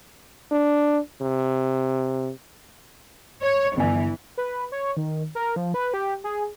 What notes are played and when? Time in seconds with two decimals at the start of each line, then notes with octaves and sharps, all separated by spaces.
0.52 D4
1.22 C3
3.42 C#5
3.77 G1 E3 G#5
4.38 B4
4.72 C#5
4.97 D#3
5.35 A#4
5.56 F3
5.74 B4
5.94 G4
6.24 G#4